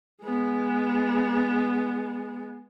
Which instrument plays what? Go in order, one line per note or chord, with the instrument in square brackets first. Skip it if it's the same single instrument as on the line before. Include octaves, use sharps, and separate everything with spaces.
[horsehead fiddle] G#3 B3